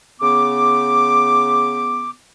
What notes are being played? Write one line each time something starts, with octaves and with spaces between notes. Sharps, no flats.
C#3 B3 D6